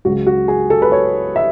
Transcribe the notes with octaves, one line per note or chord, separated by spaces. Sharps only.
C#2 C#3 F#3 F#4
F#4
G#4
A4
B4
C#5
E5